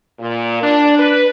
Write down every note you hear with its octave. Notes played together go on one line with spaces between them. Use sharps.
A#2
D4
B4